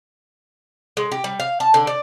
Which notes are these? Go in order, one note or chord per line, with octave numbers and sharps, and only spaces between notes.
G#3
G4
G3
F5
A5
D3
D5